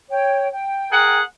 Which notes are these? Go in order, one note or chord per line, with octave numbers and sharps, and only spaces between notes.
C#5 G5
G5
G#4 A#4 F#5